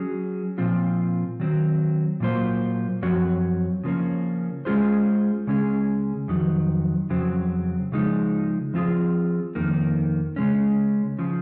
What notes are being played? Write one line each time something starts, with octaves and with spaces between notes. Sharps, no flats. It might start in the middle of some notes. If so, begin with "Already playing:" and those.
Already playing: F#3 C#4 G#4
A#2 F3 C4 F4
D#3 F#3 C4
A#2 F#3 A#3 F4 C5
F#2 F3 C4 F#4 C#5
C#3 F3 A#3 C#4
G#3 C#4 F4 G#4 C5
C#3 G#3 C#4 G#4
F2 D#3 F#3
F2 C#3 F#3 C4
C#3 F3 G#3 D#4
F3 C4 F4 G#4
F2 D#3 A#3
C#3 G#3 C#4
C#3 F3